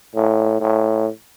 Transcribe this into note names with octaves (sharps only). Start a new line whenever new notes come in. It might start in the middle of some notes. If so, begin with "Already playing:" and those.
A2
A2